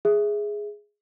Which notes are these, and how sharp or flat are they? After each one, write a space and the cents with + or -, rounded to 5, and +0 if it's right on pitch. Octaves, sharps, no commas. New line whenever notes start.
G#4 +0 E5 +0